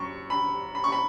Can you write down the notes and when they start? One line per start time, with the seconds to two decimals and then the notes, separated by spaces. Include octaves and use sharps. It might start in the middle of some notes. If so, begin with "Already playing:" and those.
Already playing: F#2 C#6
0.30 B5
0.75 B5
0.84 C#6
0.92 B5